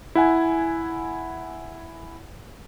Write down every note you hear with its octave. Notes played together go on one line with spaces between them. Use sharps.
E4 F#5 G#5